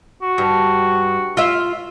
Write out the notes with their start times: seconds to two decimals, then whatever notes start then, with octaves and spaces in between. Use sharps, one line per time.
0.22 F#4
0.38 G2
1.37 F4 E5